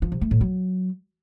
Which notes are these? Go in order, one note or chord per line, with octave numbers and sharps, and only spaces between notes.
F3
C3
A3
A2
F#3